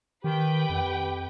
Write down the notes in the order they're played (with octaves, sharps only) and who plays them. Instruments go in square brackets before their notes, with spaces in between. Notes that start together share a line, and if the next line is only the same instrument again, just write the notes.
[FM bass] D#3 [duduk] G4 [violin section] B4 G5
[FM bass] F2